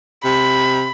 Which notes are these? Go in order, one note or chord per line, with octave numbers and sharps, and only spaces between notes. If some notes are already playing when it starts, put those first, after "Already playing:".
C3 B5